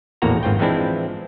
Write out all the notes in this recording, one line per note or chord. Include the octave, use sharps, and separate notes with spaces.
A#1 E2 A2 A#3 F#4 A#5
G#1 G#2 C4 F4 G5
E3 F3 G#3 C4 D4 E4